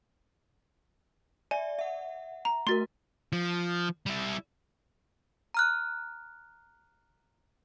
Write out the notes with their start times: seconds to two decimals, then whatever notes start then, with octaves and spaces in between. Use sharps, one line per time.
1.51 D5 E5 G#5
1.79 E5 F#5
2.45 A#5
2.67 A3 F#4 A#4 C6 A6
3.33 F3
4.06 G3 E4
5.54 A#5 F6 F#6